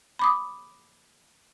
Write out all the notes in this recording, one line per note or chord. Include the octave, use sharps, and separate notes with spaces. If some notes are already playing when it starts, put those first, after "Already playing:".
B5 D6 D#6